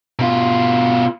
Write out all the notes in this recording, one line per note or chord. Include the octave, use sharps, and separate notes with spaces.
B2 F4